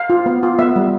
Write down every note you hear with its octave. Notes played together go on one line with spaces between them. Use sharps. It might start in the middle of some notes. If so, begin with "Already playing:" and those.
Already playing: F5
F4
B3
F4
B3 E5
G3